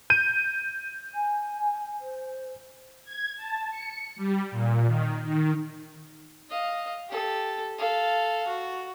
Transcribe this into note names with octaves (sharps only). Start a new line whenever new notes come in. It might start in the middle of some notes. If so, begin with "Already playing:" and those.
G6 D#7
G#5
C5
G#6
A5
C#7
G3
A#2
D#3
D#3
D#5 F5
G4 A4
A4 F5
F#4